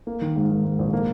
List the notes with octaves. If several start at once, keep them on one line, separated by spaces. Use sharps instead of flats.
A#3
D#3
G#2
D#3
G#2
A#1
A#3